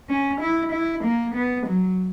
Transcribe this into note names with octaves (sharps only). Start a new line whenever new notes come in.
C#4
E4
E4
A#3
B3
F#3